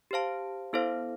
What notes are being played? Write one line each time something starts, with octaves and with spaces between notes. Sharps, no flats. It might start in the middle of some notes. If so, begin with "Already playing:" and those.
G4 C5 F5 A5
B3 E4 A4 C5 F5